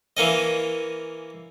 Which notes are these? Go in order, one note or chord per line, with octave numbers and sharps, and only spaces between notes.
E3 A#3 C#4 D#5